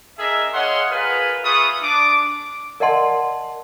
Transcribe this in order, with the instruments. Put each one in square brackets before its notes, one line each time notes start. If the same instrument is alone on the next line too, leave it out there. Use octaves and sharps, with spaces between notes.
[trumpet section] D4 G#4 A#4 D#5 E5
G#4 C#5 D#5 F5 F#5 C6
F4 G#4 A#4 B4 F5
F4 G#4 B4 E5 C#6 D#6
D4 D6
[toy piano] A#4 D5 D#5 F#5 A5 C6